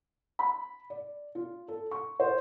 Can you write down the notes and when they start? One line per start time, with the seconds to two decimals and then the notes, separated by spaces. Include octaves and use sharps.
0.39 B5
0.90 D5
1.35 F4
1.68 A4
1.91 C#6
2.20 C5